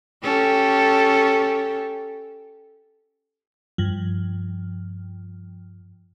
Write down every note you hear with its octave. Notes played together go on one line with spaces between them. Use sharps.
C#4 G4 A4
G2 F3